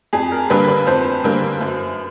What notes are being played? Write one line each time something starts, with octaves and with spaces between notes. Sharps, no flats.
F2 G#4
A#4
D3 G3 A#3 B4
B4
F2 C5
D3 G3 A#3
F#2